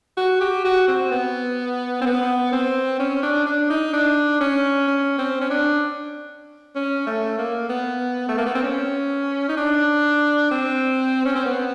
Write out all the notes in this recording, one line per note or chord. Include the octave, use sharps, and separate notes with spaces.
F#4
G4
F#4
C4
B3
C4
B3
C4
C#4
D4
D4
D#4
D4
C#4
C#4
C4
C#4
D4
C#4
A3
A#3
B3
A3
A#3
B3
C4
C#4
D#4
D4
C4
C#4
C4
B3